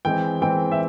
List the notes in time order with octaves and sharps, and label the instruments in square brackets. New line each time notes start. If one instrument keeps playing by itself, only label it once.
[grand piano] E3 G#3 C4 [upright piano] G5
[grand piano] E3 G#3 C4 [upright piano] G5
[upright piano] E5